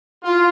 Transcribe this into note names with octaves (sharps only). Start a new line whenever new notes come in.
F4